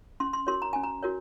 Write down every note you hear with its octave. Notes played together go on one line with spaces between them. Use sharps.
C#4 C6
C6
F#4 A#4 C#5 C6
A#5
C#4 G#5
A#5
F#4 A#4 C#5